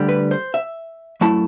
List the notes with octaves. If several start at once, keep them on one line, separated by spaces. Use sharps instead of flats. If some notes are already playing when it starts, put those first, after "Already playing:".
Already playing: D2 D3 G3
B4
C5
E5
F#2 F#3 A3 E4 A5